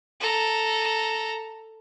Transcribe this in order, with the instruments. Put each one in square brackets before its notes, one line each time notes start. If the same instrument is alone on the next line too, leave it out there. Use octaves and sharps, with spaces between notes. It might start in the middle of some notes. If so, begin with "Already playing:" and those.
[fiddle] A4 A#5